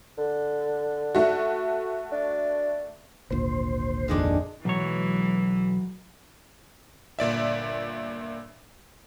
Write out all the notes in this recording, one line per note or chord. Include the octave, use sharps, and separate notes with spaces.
D3
A3 F#4
D4
G#1 D2 A#2 C5
F2 D#3 G#3 D4
B1 E3 F#3 G#3 C#5
G1 A#2 D5 E5